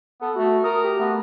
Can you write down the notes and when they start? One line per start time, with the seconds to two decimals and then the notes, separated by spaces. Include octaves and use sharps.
0.21 B3 A4
0.36 A3 F#4
0.64 A#4 D#6
0.84 G4
1.00 A3 B3